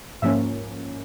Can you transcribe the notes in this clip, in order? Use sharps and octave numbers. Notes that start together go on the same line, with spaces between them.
G#2 F3 A#3 C#4 E5